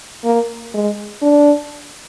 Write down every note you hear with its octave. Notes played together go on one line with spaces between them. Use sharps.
A#3
G#3
D4